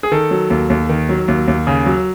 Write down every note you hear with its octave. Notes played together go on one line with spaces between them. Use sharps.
G#4
D#3 A4
F#3
D#2
D#2
D#3
F#3
D#2
D#2
C#3
F#3